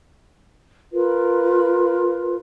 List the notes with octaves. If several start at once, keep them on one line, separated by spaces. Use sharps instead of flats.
F4 A#4 B4